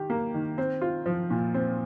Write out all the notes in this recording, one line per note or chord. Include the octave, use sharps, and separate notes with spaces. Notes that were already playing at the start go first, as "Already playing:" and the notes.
Already playing: D#3 G4
A#3
D#3
C4
F4
F3
A#2
C4